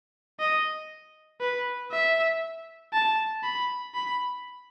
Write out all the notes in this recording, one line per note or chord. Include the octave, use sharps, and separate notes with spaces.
D#5
B4
E5
A5
B5
B5